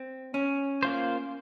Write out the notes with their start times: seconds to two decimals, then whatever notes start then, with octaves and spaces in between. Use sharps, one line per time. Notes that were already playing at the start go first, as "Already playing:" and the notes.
Already playing: C4
0.34 C#4
0.83 A#3 F4 C5